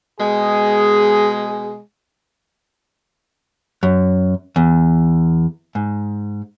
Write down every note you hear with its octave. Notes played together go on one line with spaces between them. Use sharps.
B2 G#3 G#4
F#2
E2
G#2